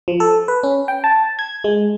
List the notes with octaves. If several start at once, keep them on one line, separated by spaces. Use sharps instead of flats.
F3
A4
B4
C#4
G5
A5
G#6
G#3